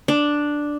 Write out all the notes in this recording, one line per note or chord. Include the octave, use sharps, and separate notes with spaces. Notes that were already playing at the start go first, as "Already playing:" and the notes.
D4